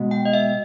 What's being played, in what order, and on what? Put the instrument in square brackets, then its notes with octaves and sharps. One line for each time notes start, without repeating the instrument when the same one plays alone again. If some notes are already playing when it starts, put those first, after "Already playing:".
Already playing: [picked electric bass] B2 G#3 B3
[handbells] G5
D#5
E5